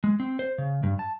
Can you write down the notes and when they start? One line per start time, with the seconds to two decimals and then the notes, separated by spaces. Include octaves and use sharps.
0.04 G#3
0.20 C4
0.39 C5
0.58 C#3
0.83 G2
0.99 A5